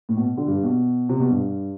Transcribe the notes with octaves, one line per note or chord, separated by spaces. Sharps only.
A2
B2
D3
G2
B2
C3
B2
G2